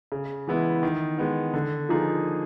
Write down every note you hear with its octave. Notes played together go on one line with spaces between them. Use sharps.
C#3
E3 G#3 B3 E4
D#3
G#3 B3
D3
F3 A#3 D#4 G#4